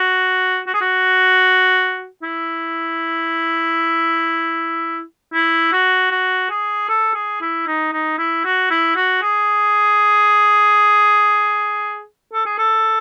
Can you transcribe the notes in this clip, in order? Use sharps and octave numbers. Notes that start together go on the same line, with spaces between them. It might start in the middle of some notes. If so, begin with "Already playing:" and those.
Already playing: F#4
F#4
G#4
F#4
E4
E4
F#4
F#4
G#4
A4
G#4
E4
D#4
D#4
E4
F#4
E4
F#4
G#4
A4
G#4
A4